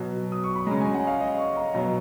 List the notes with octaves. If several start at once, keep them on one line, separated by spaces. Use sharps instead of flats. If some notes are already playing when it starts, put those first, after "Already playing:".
Already playing: B2 F#3
D#6
C#6
B5
C#3 G#3 A#5
G#5
F#5
F5
D#5
C#6
A#5
B2 F#3 A#5